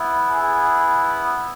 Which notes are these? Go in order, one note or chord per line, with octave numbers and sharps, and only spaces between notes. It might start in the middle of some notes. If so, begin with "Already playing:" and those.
Already playing: B3 E4
G#4